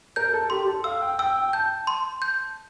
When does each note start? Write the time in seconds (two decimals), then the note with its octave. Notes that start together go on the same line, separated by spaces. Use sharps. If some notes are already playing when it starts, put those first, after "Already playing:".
0.16 A#4 G6
0.33 A4
0.50 G4 C6
0.67 A4
0.84 F5 E6
1.02 G5
1.19 G5 E6
1.36 G5
1.53 A5 G6
1.87 C6
2.22 G6